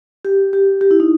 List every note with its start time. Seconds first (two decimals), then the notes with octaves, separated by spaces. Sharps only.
0.25 G4
0.53 G4
0.81 G4
0.91 E4
1.00 D#4